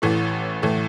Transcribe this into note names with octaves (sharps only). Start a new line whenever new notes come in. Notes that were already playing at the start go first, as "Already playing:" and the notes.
A1 A2 E3 A3
A2 E3 A3